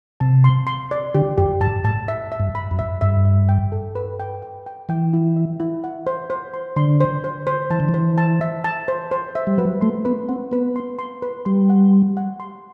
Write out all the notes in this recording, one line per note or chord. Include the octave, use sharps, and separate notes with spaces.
C3 A5
C6
C6
D5
D3 G4
F#2 G4
G2 A5
A2 A5
E5
E5
G2
B5
F#2
E5
G2 E5
E5
G5
A4
B4
G5
G5
G5
E3 G5
E4
E5
E4
F#5
C5
C5
C6
D3 C6
C5
C5
C5
E3 A5
D3
E3
C5
A5
E5
A5
C5
C5
E5
G3
F#3 B4
A3 C6
B3 B4
C4 F#5
B3 B4
C6
C6
B4
G3 C6
F#5
C6
F#5
C6